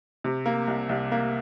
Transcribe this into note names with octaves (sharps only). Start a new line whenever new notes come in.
C3
A#3
C2
C2
A#3